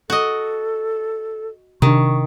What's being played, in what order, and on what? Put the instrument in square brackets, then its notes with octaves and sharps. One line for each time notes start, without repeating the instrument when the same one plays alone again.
[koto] F#4 D#5 [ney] A4
[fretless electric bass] C3 D4 [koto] D#3 [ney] C#6